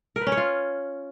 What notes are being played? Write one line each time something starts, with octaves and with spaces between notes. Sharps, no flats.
A#4
B4
C#4
C#5
F4